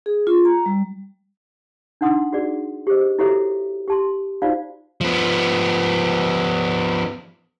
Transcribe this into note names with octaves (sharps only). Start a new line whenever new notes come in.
G#4
F4
A#5
G3
D4 D#4 F#5 C6 D#6
F#4 G#4 D5
G4 G#4 C5 D#5
E4 F#4 G4 A4 C#5 E5
G4 A5 C6
D#4 F4 F#4 C5 D5 F5
F3 B3